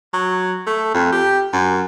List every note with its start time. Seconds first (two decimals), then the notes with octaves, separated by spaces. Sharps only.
0.14 F#3
0.67 A3
0.94 F2
1.12 G4
1.53 F#2